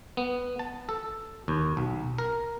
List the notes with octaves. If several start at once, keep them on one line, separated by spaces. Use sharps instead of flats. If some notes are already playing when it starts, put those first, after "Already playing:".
B3
A5
A4
D#2
B1
A#4